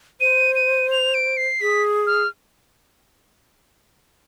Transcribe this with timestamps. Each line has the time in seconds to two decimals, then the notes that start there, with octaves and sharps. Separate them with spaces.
0.21 C5 D#7
0.55 D#7
0.91 F7
1.14 D7
1.37 C7
1.61 G#4 B6
2.07 F6